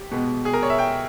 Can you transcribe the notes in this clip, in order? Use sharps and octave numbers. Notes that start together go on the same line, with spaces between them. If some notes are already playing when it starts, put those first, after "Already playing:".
Already playing: G4
B2 G#3 B3
G#4
A#4
C#5
E5
G5